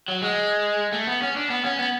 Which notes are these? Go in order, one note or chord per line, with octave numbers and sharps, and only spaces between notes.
F#3
G#3
A3
B3
C#4
D4
B3
C#4
B3